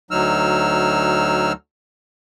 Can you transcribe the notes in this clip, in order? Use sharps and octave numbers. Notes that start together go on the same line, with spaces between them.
D2 F#3 D#4 E6 F6